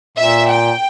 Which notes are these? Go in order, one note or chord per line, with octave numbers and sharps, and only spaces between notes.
A#2 E5
G5